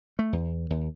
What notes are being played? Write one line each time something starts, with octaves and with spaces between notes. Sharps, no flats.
A3
E2
D#2